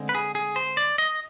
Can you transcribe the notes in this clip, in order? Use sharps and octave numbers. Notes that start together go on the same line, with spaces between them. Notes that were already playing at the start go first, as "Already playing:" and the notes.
Already playing: D3 G#3 C4
B4
G#4
G#4
C5
D5
D#5